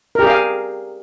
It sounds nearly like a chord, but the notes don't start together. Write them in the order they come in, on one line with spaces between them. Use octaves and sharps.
A#4 G4 G#4 F5